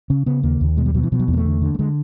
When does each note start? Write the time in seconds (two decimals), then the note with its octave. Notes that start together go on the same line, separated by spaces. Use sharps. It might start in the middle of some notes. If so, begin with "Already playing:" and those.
0.10 C#3 C#4
0.26 C#3 B3
0.43 D#2 A#3
0.61 D#2
0.77 B2 G#3
0.86 G3
0.94 B2 F#3
1.03 E3
1.12 B2 F3
1.20 F#3
1.28 E2 D#3
1.33 A#3
1.37 A3
1.45 D3
1.62 D3
1.74 A3
1.79 D3 G#3